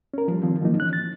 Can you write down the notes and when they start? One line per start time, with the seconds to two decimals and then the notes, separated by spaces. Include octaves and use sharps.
0.14 C#4 A#4
0.28 F3 G3
0.43 D#3 F3 C4
0.61 D#3 F3 F#3 A#3 D#4
0.80 E3 C#4 F#6
0.93 A6